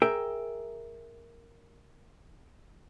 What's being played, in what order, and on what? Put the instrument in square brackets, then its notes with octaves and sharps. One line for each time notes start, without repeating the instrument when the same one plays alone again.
[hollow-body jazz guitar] G#4 A#4 E5 G5